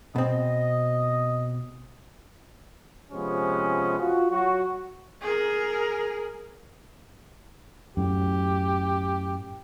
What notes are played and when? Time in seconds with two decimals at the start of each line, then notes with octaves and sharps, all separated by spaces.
0.16 B2 C4 D#5
3.11 C3 F3 G#3 B3 C#4
4.00 F4 F#4
4.31 F#3 F#4
5.21 G#4 A#4
7.97 F#2 A2 G4